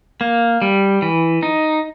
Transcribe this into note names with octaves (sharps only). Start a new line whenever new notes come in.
A#3
G3
E3
D#4